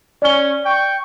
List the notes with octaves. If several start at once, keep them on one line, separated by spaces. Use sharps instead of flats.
C#4 D5 G7
G5 C#6